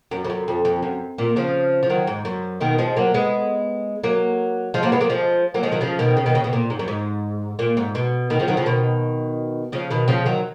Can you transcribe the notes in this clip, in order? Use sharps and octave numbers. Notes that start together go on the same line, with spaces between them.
F#2
F2
F#2
F2
F2
F#2
A#2
C#3 F3
F3
D#3 F#3
G#2
F#2
B2 D#3
F3 G#3
F#3 A#3
G#3 B3
F#3 A#3
F3 G#3
F#3 A#3
G#3 B3
F#3 A#3
F3 G#3
F#3 A#3
F3 G#3
D#3 F#3
C#3 F3
B2 D#3
C#3
B2 D#3
C#3
B2
A#2
G#2
F#2
G#2
A#2
G#2
B2
B2 D#3
C#3 F3
D#3 F#3
C#3 F3
B2 D#3
C#3 F3
B2 D#3
C#3 F3
D#3 F#3